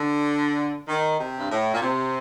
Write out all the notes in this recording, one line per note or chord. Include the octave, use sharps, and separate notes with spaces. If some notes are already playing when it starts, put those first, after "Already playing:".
Already playing: D3
D#3
C3
G2
A2
A#2
C3